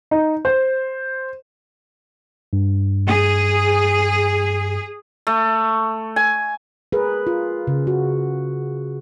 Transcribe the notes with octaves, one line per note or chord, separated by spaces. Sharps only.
D#4
C5
G2
G#4
A3
G#5
G#4 A#4 B4
F4
C#3
F#4